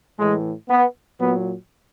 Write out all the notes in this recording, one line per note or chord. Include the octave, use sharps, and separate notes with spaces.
A2 E3 G#3
B3
A#2 F#3 B3